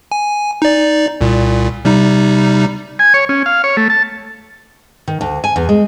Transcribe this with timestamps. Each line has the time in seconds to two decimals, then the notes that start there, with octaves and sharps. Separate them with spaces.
0.12 G#5
0.62 D#4 D5
1.21 C2 A#2
1.85 C3 G3 D#4
2.99 G#5
3.14 C#5
3.29 C#4
3.46 F5
3.64 C#5
3.77 A3
3.90 A5
5.08 D#3
5.21 D2
5.44 G#5
5.56 E2
5.69 G#3